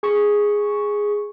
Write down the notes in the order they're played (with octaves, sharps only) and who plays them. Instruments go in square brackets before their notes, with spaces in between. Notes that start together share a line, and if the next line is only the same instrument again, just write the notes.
[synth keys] G#4 C#6